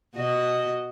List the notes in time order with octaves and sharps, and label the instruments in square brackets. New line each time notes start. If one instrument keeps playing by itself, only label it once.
[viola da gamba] B2 F#4 D#5